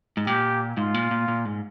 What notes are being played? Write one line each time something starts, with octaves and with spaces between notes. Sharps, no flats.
G#2
A#2 G4
G#2 F4
A#2
A#2
A#2
G#2